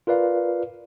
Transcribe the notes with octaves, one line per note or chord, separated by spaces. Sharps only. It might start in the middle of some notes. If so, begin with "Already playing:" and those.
F4 A#4 B4 D5 F5